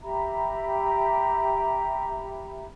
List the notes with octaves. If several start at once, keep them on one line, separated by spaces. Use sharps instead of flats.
G4 E5 A#5 B5